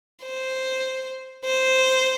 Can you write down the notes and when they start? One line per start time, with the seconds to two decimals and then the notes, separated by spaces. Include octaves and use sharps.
0.23 C5
1.45 C5